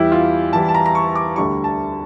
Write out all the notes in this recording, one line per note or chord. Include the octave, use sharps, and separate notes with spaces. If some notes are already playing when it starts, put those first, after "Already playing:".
Already playing: E2 E3 G3 E4 G4
F4
E2 E3 G3 A5
A5
A#5
A#5
C#6
D6
D2 D3 G3 C#6
A5